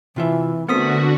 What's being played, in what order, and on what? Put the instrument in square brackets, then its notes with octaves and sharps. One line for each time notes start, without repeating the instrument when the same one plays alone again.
[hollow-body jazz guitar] C3 F4 E5 [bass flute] E3
[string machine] D3 F#4 [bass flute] A3 [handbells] B3 D#6 B6 [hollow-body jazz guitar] C4 A#4